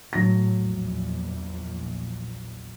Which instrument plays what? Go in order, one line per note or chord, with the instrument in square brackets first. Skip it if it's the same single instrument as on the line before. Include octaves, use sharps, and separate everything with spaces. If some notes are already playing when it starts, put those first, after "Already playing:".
[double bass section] A2 A3 [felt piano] F#3 A#6
[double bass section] A#1 E2